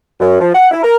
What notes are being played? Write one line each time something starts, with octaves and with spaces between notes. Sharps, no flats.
F#2
F3
F#5
E4
A#4